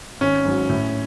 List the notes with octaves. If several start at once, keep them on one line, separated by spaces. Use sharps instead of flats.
G#1 C#4
G#2 F#3
A2